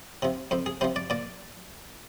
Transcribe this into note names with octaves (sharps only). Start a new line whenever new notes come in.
C3 F3
F2 C5
G#4
C3 F3 C5
D5
A#2 D5